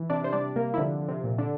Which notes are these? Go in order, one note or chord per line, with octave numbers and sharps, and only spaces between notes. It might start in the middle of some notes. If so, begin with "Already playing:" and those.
Already playing: E3
C3 D4 D5
C5
G3 D4 D5
C3 A#3 A#4
E4
D3 F3 D4
F3
C3 C4
A#2
D3 D4